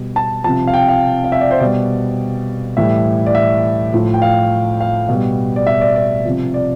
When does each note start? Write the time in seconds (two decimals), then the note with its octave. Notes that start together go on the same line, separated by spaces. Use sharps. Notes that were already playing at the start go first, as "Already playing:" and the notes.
Already playing: B2 G3
0.16 A5
0.44 F3 A5
0.49 C3
0.67 F5
0.74 G5
0.89 F5
1.24 F5
1.32 E5
1.41 D5
1.51 C5
1.60 B2 G3 D5
2.77 A2 E3 G3 E5
3.26 D5
3.35 E5
3.93 A2 F3
4.14 G5
4.22 F5
4.81 F5
5.09 B2
5.14 G3
5.56 D5
5.67 E5
5.81 D5
5.96 D5
6.25 C3 F3
6.54 D5